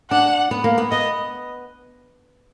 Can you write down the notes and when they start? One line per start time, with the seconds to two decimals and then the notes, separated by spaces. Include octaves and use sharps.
0.11 D4 F#5
0.51 B3
0.64 A#3
0.78 B3
0.91 B3 D#5